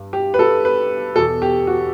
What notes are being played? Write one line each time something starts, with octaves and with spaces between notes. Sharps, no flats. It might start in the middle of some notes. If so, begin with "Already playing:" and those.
Already playing: G2
G4
B4
A4
B4
E2 B2 A4
G4
F#4